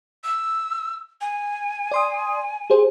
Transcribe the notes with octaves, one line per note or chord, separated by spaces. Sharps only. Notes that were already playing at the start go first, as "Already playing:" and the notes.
E6
G#5
D5 C6 D#6
G4 G#4 C5